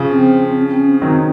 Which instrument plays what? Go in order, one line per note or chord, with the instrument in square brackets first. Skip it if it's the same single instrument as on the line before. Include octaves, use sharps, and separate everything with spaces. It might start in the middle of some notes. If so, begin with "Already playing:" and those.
Already playing: [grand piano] C#3 F3
[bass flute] C4
C#4
C4
C#4
[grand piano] D#3 F#3 [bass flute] C4